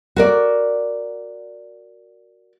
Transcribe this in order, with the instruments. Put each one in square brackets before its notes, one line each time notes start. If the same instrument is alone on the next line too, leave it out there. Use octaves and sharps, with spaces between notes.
[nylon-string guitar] F#4 A#4 D5